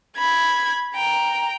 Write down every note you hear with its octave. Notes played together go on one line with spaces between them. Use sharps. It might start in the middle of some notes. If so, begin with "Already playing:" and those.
B5 G#6
G5 A#5